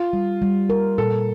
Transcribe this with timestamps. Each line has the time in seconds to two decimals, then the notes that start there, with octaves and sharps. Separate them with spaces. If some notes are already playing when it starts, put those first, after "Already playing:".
Already playing: F4
0.13 G3
0.42 G3
0.70 A#4
0.98 A#2 A4